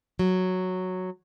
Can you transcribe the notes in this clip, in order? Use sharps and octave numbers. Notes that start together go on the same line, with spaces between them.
F#3